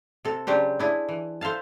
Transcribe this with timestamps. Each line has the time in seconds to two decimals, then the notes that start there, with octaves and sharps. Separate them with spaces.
0.25 C3 A4
0.47 C#3 F#3 D4 G4 C5
0.79 D4 E4 G#4
1.09 E3
1.41 A4 C5 E5 F5 A5